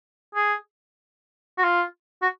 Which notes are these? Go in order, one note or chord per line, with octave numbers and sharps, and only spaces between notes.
G#4
F#4
F4
F#4